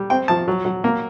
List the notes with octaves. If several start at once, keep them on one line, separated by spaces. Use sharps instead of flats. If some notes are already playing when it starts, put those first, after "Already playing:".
Already playing: G3
C4 G5
F3 A5
F#3
F#3
A#3